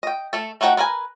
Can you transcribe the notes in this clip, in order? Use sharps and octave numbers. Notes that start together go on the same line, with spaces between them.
D#5 G5
A3 A4
A3 D#4 F#4 F#5 G5
B3 A#4 B4 G#5 A#5